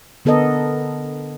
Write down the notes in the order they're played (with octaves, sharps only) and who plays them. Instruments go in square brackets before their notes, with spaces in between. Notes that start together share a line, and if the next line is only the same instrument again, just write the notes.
[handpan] D3 B3 A4 A#4 D#5